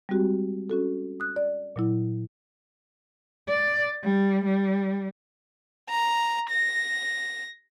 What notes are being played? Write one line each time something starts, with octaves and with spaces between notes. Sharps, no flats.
G3 G#3 C4 F#4 G4
C#4 F#4 A4
D#6 F#6
D5
A#2 F#3 E4
D5
G3
G3
A#5
A#6